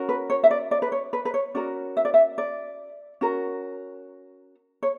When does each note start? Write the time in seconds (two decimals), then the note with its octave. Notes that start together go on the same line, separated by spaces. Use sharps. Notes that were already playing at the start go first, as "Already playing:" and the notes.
Already playing: C#4 F#4 A#4
0.09 B4
0.30 C#5
0.44 E5
0.51 D5
0.71 D5
0.82 B4
0.92 C#5
1.13 B4
1.25 B4
1.34 C#5
1.55 C#4 F#4 A#4 D5
1.97 E5
2.05 D5
2.14 E5
2.38 D5
3.21 C#4 F#4 A#4
4.83 C#5